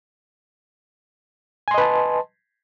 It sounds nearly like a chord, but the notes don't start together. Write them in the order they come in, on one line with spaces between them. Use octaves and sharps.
G#5 C6 D#5 B4 A5